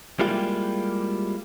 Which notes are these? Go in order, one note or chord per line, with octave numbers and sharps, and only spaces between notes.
G3 G#3 A#3 E4 F4 G4